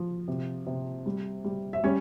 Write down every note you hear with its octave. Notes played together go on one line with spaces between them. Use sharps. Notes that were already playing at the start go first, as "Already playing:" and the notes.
Already playing: F3
C3
C3
G3
G3
E5
G3 C#4 C#5